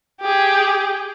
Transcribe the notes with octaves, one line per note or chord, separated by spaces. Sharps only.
G4 G#4